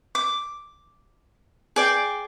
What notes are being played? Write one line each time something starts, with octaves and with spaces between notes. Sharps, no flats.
D6
G#4 D5 G5